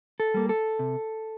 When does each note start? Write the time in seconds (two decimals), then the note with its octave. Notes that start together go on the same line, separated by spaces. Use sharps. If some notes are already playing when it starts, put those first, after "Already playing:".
0.20 A4
0.34 G3 A#3
0.49 A4
0.79 C3